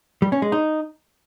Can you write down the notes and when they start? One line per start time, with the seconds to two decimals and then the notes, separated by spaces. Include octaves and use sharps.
0.22 G3
0.32 C#4
0.42 G#3
0.52 D#4